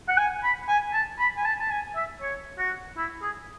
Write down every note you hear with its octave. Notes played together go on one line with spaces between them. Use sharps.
F#5
G#5
B5
G#5
A5
B5
G#5
A5
A5
G#5
E5
C#5
F#4
E4
G#4